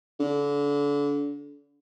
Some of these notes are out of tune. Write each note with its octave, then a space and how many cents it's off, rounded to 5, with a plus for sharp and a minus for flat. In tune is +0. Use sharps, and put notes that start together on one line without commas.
D3 -30